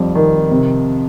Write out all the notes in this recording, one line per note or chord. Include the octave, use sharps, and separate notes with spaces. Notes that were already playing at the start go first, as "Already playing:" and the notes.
Already playing: F2 C3 G3
D#3
C3